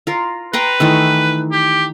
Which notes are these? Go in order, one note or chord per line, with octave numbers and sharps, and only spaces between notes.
F4 A#4
B4 G5 A#5 C6
D#3 E3 A3
G4